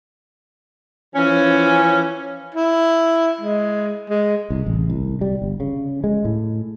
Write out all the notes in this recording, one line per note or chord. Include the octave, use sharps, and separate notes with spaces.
E3 F3 C#4
E4
G#3
G#3
C2
A1
C2
G3
G1
C#3
G#3
A2